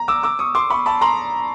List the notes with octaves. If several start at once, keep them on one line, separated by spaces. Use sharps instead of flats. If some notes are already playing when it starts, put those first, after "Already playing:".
Already playing: A#5
D6 E6
D6 E6
C#6 D#6
C6 D6
B5 C#6
A5 B5
A#5 C6